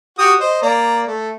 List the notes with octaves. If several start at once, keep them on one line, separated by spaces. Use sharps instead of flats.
F#4 G4 D#6
C5 D#5
A#3 D5 A#5
A3